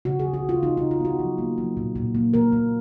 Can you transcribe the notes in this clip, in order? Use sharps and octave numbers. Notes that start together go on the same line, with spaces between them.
C#3 F#4
C#3 G#4
F#4
C#3 F4
C#3 D#4
C#3 D#4
F4
B3 F#4
F#3
A#3
F#3
A#2
A#2
A#3
A#3 A#4
A#3